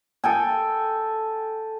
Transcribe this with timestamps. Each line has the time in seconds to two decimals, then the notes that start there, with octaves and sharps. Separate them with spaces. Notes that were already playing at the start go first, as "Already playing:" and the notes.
0.24 A4 G5 G#5